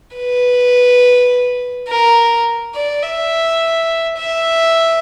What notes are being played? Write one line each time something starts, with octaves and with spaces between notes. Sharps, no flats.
B4
A#4
D5
E5
E5